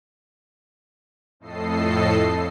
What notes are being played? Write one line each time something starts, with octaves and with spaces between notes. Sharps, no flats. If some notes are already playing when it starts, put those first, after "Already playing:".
F2 A2 A4 D#5 C7